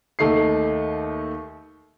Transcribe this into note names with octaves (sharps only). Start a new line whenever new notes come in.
D#2 A3 D#4 C7